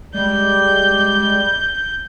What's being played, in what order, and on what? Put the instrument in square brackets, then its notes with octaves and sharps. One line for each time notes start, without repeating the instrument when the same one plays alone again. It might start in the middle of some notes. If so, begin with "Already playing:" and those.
[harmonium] G3 D5 [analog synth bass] G#3 [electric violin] G6